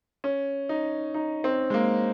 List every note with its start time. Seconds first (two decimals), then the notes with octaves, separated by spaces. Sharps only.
0.24 C#4
0.69 D#4
1.14 D#4
1.44 C4
1.70 G#3
1.74 A#3